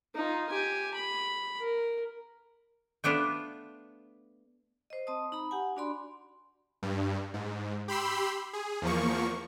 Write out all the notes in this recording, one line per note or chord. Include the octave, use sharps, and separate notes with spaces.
D#4 F4
G4 G#5
B5
A#4
A3 B3 D4 F4
C5 D#5
C4 D#5 A5 D#6
D#4 A#5 B5
G4 F#5 G#5
D4 F#4 D5 B5 C6
G2
G#2
G4 B5 C6 E6
G#4
E2 F3 A#3 C#6